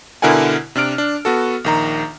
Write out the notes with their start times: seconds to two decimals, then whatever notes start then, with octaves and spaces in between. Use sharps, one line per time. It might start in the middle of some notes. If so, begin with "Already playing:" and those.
0.22 B2 D3 E4 A#4 F#5 G#5
0.76 C3 D4 F6 D7
0.98 D4
1.25 B3 F#4 A4
1.64 A#1 D#3 A#5